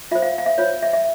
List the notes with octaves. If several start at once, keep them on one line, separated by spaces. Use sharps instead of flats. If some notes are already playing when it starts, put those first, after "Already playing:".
F4 C5 E5
F5
F5
E5
F4 C5 C#5
E5
E5